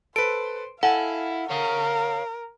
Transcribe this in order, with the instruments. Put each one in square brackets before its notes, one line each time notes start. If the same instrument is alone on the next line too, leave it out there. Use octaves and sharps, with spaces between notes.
[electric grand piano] A4 B4 [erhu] C5 [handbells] D7
[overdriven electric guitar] E4 [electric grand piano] A4 G#5 [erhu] F5 [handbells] F#5
[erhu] A#4 [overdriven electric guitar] C#5 F5